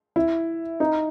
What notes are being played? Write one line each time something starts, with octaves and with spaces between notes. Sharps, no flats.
E4
D#4